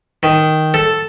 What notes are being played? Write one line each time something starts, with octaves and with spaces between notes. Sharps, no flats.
D#3
A4